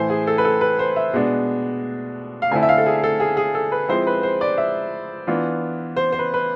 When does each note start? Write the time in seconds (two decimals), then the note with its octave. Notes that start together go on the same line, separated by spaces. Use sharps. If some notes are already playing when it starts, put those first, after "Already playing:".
Already playing: A2 E3 A3 E4 C5 G#5
0.10 G#4
0.27 A4
0.38 B4
0.45 A4
0.61 B4
0.79 C5
0.96 E5
1.13 B2 G#3 B3 D4
2.42 F5
2.51 D3 A3 C4 E4 G#5
2.63 E5
2.69 F5
2.78 A4
2.86 G#4
3.03 A4
3.20 G#4
3.37 G#4
3.55 A4
3.72 B4
3.89 F3 G#3 C4 E4 C5
4.07 B4
4.23 C5
4.41 D5
4.58 E5
5.27 E3 B3 D4 F4
5.96 C5
6.12 C5
6.19 B4
6.34 B4